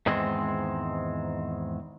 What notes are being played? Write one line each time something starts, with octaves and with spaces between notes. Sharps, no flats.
E2 G#2 D#3 G#3 C4